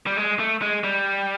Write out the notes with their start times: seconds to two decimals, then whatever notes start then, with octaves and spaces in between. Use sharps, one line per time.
0.07 G3
0.17 G#3
0.39 A3
0.62 G#3
0.84 G3